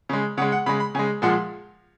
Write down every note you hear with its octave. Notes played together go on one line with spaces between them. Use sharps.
C#3 G#3
C#3 G#3 F#5
F#5
C#3 G#3 B5
B5
C#3 G#3 G#5
A#2 F3 G#3 F#5